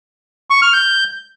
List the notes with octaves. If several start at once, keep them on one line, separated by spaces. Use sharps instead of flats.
C#6
F6
G6